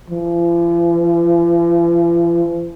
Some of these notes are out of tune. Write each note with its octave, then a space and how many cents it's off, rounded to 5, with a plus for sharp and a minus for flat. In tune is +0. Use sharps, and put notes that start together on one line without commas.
F3 -45